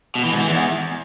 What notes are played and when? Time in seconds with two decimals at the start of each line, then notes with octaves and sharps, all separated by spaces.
0.15 B2
0.24 E3
0.32 G#2
0.40 E3
0.48 E2